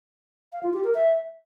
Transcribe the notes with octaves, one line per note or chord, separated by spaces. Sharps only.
F5
F4
G4
A#4
E5